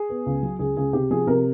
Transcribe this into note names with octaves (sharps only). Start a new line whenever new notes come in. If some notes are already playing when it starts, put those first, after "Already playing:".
Already playing: G#4
B3
C#2
F#3
C#2 G#4
C#2 G#4
C3 G4
F3 G#4
C3 A#4